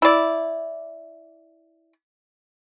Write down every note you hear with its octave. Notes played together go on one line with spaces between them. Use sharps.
E4 D5